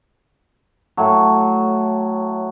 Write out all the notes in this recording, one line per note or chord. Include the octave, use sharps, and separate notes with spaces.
A2 F#3